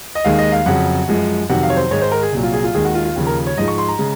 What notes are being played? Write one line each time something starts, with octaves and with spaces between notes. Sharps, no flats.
D#5
D#2 D#3 G#3 F5
D#5
F5
F2 C#3 F#3 F#5
F#2 F3 G#3
F2 C3 D#3 F#3 F#5
F5
C#5
C5
G#2 D#3 G#3 C#5
C5
A#4
G#4
C2 A#2 F#3
F4
G#4
F4
D#2 D#3 G#3 G#4
F#4
F4
F4
D#2 C#3 F3
A#4
C#5
G#2 F3 G#3 D#5
C#6
C6
A#5
C#3 G#3